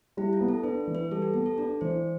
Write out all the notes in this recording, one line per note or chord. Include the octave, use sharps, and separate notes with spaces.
G3 E4
F4
B3
A4
D4 B4
E3
B4
G3 A4
G4
B3 A4
A4
D4 D5
E3 C5